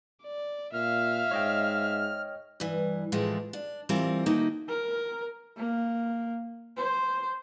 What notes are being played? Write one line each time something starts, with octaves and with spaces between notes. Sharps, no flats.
D5
A#2 E5 F5 F6
G#2 C#5 D#5 G5
G2 E3
A2 E3 F3 G#3 A3
D4
E3 G3 C4 F4 A#4
D#3 A3 A#3 D#4 F#4
A#4
A#3
C5